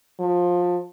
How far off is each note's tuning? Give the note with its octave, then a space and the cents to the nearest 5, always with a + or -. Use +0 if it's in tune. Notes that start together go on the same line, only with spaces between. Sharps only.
F3 +20